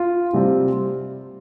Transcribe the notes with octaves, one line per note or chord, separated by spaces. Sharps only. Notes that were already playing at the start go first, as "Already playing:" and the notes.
Already playing: F4
C3 G3 C4